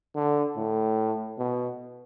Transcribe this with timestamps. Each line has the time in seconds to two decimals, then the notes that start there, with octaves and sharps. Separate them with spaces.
0.15 D3
0.56 A2
1.39 B2